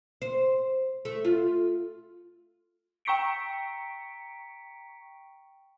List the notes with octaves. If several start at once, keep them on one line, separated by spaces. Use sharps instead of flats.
C5
A3
F4
G5 A#5 C#6 B6 C#7 D7